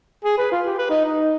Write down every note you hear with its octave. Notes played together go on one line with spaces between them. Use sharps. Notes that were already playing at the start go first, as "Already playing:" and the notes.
G#4
B4
F4
G4
B4
D#4
D#4